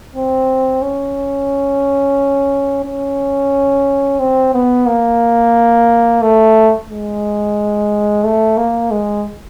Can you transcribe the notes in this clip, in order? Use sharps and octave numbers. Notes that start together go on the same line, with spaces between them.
C4
C#4
C#4
C4
B3
A#3
A3
G#3
A3
A#3
G#3